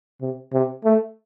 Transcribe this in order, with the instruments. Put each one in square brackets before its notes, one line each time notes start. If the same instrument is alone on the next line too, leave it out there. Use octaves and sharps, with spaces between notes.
[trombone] C3
C3
A3